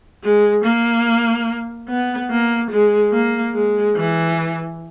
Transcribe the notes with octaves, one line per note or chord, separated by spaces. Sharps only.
G#3
A#3
B3
A#3
G#3
A#3
G#3
E3